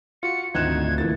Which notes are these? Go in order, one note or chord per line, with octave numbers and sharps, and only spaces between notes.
F4 F#4 C#7
G#1 D2 D#4 F4 F#6 G#6 E7
E3 F3 A#3 A6